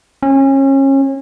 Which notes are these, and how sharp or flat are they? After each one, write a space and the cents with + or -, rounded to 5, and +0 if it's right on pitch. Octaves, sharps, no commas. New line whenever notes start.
C#4 -30